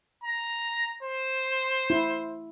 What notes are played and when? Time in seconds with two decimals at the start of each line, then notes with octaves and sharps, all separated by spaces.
0.24 A#5
1.03 C5
1.90 E4